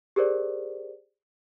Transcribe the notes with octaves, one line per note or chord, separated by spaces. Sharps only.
G4 G#4 A#4 C5 D5